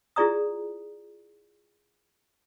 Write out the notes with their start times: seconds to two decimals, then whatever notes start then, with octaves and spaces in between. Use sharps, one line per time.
0.16 E4 F4 G#4 D5 A#5 D#6